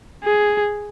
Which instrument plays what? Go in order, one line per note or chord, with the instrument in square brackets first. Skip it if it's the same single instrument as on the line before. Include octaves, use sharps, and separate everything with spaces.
[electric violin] G#4